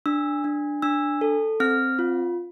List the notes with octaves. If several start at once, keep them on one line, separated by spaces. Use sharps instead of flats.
D4 E6
D4
D4 E6
A4
C4 F6
F4